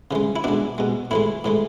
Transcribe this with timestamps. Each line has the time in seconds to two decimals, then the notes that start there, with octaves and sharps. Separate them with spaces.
0.11 C#3 E3 G#3
0.36 E4
0.44 B2 G#3 D4
0.78 B2 G#3
1.11 A2 E3 G#3 E4
1.44 A2 E3 G#3